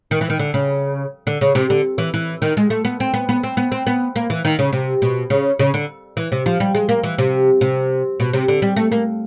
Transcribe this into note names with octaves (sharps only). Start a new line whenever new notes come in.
D#3
E3
D#3
D3
C#3
D3
C#3
C3
D3
E3
E3
D#3
G#3
A3
B3
C4
B3
B3
C4
B3
C4
B3
A#3
E3
D#3
C#3
C3
B2
C#3
C#3
D3
E3
C3
F3
G3
G#3
A#3
E3
C3
C3
B2
C3
D3
G3
A3
A#3